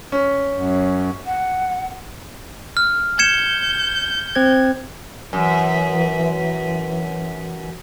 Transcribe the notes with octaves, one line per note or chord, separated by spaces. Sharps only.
C#4
F#2
F#5
F6
G6 G#6 C#7 E7
C4 C5 G#6
F#2 E3